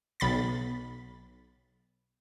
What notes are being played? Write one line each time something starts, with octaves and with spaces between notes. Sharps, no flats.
B1 B5 A6